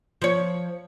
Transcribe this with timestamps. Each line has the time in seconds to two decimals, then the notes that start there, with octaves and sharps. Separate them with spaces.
0.22 F3 C#5